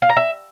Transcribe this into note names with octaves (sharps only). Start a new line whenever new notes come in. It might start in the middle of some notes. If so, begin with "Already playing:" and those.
F5
A#5
E5